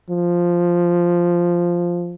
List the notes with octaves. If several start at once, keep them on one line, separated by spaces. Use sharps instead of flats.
F3